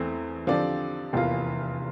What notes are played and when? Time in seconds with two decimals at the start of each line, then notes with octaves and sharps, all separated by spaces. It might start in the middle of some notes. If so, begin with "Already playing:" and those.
Already playing: E2 E3 A3 C4
0.47 D3 F3 C4 G4 D5
1.13 F1 E2 E3 A#3 F4